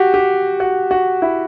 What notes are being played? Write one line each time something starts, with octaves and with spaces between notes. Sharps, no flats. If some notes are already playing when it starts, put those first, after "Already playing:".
Already playing: F#4 G4
G4
F#4
F#4
E4